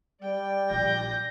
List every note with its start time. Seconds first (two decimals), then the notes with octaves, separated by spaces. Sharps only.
0.20 G3 D5 G5
0.71 A#1 G6 A#6